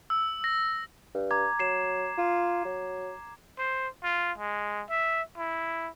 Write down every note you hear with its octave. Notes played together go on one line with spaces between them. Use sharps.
E6
A#6
G2
A#5 D6 G#6
F#3 C7 E7
F4
F#3
C5
F4
G#3
E5
E4